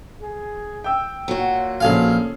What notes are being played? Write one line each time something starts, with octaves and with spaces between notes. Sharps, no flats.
G#4
G5 E6
A#2 F#3 F#4
A#1 C#4 G#4 A4 F5